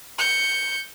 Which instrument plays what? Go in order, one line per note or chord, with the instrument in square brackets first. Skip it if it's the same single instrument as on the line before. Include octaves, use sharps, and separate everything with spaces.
[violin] G6 C#7